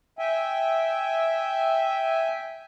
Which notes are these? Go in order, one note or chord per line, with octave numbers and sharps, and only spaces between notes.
E5 G5 G#5